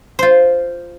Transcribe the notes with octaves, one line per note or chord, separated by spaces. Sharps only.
F4 C5